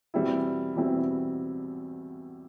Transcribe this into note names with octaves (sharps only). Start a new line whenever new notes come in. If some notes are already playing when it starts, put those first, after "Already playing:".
E2 B2 G3 C4 E4
E2 B2 G3 C4 E4